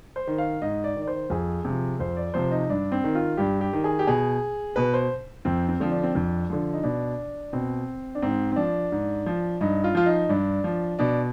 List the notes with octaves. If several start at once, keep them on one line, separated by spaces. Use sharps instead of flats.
C5
D#3
F5
G#2 D#5
D5
D#3
D5
C5
F2 G#4
C3 F3
F2 C5
D5
C3 F3 C5
D#4
G2 D4
C4
D#3
F4
G2 G4
G4
D#3
G#4
G4
B2 G#4
B2 B4
C5
F2 C4
C4
D3 F3
D4
C4
F2 D4
D3 F3
D#4
B2 D4
B2 C4
D4
G#2 C4
C4
F3 D4
G#2
F3
G2 D#4
F4
F3 F4
D#4
G2 D4
F3
B2 D4